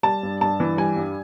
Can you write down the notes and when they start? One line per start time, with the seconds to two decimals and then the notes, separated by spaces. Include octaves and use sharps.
0.03 G3 A5
0.23 G2
0.41 G2 A5
0.60 E3
0.77 G3 G#5
0.96 G2